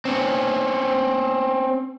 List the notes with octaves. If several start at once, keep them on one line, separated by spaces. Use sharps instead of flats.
C4 C#4